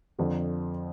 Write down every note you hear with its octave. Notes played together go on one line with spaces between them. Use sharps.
F2 D3 F3